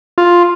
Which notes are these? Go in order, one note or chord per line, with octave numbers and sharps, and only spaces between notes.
F4